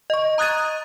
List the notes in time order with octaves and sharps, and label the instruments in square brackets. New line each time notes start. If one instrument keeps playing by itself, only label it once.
[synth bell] D#5 C#6
A#5 D#6 F#6 G#6 A6 D#7